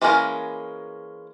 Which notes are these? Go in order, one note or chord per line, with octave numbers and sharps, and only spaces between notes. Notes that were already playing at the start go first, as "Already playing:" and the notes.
E3 G#3 A#3 C#4 A#4